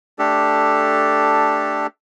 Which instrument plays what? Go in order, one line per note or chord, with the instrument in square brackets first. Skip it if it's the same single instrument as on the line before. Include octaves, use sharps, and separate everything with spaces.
[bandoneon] A3 D4 G4 A4